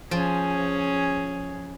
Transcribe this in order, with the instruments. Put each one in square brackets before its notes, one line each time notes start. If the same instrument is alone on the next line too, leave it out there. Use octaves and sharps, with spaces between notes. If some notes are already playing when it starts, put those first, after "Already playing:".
[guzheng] F3 [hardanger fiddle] C#4 G#4